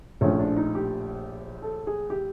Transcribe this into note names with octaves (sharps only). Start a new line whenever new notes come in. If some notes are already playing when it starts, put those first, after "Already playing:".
A#1 A2 F3 C#4
D4
D#4
G4
A4
G#4
G4